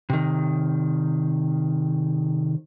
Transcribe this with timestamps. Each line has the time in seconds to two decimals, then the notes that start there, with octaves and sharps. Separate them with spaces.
0.10 C3 D#3